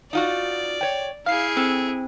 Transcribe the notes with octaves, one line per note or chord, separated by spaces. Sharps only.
D#4 F4 F#4 D5
C#5 G5
E4 G#4 F5 F6 C7
C4 A4